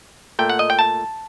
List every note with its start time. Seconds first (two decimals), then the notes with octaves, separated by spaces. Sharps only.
0.39 A#2 A3 G5
0.50 F#5
0.59 D#5
0.70 G5
0.79 A5